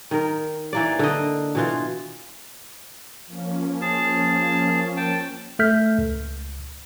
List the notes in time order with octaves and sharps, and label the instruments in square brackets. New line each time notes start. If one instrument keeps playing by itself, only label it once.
[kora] D#3 A#4
E3 A#3 D5
D3 D#5
B2 E3 F4
[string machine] F3 A#3 C#4
[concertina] G#4 A5
G5 A5
[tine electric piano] A3 A4 E5 F6 G6 B6
C#2